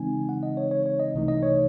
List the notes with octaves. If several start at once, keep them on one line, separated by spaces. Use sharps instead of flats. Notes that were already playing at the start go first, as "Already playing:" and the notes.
Already playing: C#3 E3 G#3 C4 D#4 G#5
F#5
D#5
C#5
C#5
C#5
D#5
C2 C3 E3 A3 D#4
D#5
C#5